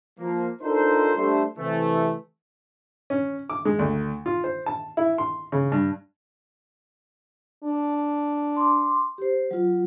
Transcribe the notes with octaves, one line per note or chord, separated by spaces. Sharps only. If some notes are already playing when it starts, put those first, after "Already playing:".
F3 A#3
D4 D#4 F4 A4 A#4 C5
G3 A3 D4 C5
C3 E3 A3
C#4
D6
G#3
D2
F4
C5
A5
E4
C6
C#3
G2
D4
C6 D6
G4 C5
F#3 F4